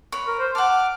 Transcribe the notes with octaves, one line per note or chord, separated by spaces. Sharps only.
B4 C#5
A#4
C5
F#5 A5 D6 F6